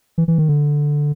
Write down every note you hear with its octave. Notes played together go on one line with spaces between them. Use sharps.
E3
E3
D#3
D3